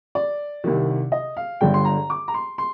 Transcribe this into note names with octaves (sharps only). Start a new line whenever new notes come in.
D5
C2 C3 D#3
D#5
F5
G1 G2 D3 G5
C6
A#5
D6
A#5
C6
C6